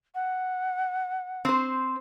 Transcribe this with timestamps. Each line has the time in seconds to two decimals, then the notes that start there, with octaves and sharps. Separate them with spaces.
0.15 F#5
1.45 C4 C5